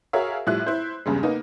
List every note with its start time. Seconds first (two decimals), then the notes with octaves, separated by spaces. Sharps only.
0.13 F#4 G#4 A#4 C#5 E5 F5
0.47 A2 F3 G3 E4 F#6
0.67 E4 C5
1.06 E2 G2 C#3 G#3
1.23 A#3 B3 D#4